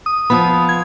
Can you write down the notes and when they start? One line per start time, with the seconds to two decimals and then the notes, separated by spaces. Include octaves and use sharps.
0.06 D#6
0.30 F3 B3 B5 D#6
0.69 G#6